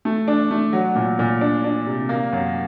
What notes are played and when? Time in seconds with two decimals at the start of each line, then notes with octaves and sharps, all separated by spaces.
0.05 A3
0.28 D4
0.51 A3
0.73 F#3
0.95 A#2
1.19 A#2
1.41 D4
1.64 D4
1.86 C3
2.09 A#3
2.33 F#2